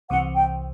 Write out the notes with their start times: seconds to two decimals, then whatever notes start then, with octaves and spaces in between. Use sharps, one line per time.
0.10 C2 C3 E3 F#5
0.35 G5